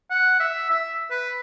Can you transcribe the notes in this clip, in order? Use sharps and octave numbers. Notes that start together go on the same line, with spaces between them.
F#5
E5
E5
B4